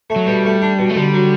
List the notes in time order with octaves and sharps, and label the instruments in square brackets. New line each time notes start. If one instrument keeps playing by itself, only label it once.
[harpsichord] A3
[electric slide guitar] F#3
[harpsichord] B2 [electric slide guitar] G3
[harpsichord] A3
D4
B2
[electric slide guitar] A3
[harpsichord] D3 [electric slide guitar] G3
[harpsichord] F#3